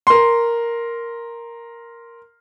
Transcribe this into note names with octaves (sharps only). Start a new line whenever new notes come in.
A#4 C6